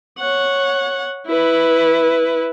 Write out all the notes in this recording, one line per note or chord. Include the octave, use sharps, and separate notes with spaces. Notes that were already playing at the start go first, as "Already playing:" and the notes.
C#5 F#5
E4 B4